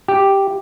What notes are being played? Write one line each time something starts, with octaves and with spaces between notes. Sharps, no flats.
G4